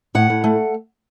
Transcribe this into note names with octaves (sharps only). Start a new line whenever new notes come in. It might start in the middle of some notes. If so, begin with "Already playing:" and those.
A2 F#5
A2
A3